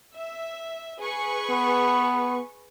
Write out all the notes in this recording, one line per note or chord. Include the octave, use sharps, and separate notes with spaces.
E5
G#4 B4 C#6
B3